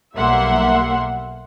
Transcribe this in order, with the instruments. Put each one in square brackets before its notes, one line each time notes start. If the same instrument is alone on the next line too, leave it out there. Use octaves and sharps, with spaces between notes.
[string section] B1 G3 A#3 E5 F#5 C6